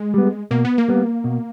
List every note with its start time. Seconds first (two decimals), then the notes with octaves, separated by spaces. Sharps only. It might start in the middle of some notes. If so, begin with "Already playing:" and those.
Already playing: G#3
0.14 G3 B3
0.51 B2 A#3
0.65 B3
0.78 A#3
0.88 G3 B3
1.24 B2